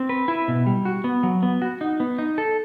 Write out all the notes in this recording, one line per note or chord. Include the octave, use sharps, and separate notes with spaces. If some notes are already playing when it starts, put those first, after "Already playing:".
Already playing: C4
B4
E4
B2
G3
F#4
B3
F#3
B3
F#4
D#4
B3
D#4
A4